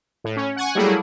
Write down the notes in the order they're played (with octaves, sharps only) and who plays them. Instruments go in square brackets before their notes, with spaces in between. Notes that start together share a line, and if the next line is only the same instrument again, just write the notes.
[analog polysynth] A2
C#4
F#5 G#5 C#6
F#3 G3 A3 A#3 E4 G#4